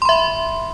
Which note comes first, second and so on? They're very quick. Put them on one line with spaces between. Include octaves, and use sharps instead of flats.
C6 B5 E5